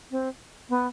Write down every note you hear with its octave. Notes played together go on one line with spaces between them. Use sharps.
C4
B3